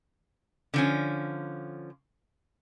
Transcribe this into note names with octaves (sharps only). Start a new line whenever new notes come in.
D3 F3 C#4